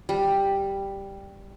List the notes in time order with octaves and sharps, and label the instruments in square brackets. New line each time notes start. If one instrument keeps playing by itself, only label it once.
[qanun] G3